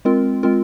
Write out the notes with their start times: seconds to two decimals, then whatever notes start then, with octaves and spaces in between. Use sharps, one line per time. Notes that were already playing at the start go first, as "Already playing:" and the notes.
0.05 G#3 C4 F4 A#4
0.43 G#3 C4 F4 A#4